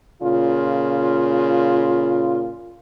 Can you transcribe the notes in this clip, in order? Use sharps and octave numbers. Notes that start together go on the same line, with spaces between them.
A#2 C#3 F4